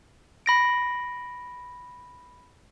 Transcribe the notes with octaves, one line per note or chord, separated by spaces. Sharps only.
B5 A#6 D7